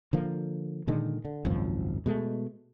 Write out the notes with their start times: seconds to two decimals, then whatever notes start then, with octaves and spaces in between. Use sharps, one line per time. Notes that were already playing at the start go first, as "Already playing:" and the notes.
0.13 D3 F3 A#3
0.87 A#2 D3 D#3 G#3
1.25 D3
1.45 G#1 C#2 F#2 F3
2.06 B2 G#3 A3